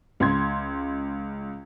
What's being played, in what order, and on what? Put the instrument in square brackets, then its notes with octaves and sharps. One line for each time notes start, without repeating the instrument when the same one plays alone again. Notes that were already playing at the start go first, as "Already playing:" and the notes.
[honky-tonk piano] C#2 C6 G#6